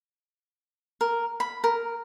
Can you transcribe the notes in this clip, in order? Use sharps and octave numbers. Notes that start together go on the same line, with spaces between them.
A#4
B5
A#4